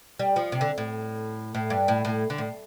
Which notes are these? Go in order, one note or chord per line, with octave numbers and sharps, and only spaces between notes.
G3
F3
C3
D3
A2
A2
G2
A2
A2
D3
A2